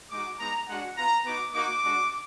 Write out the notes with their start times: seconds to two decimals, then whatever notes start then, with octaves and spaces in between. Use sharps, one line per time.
0.10 G#3 D#4 F#4 D6
0.39 G#3 B3 D#4 A#5
0.68 G#3 D4 F#4 F#5
0.97 B3 F4 A#5
1.25 B3 D#4 F#4 D6
1.54 A#3 D#4 F#4 D6
1.82 G#3 D4 F#4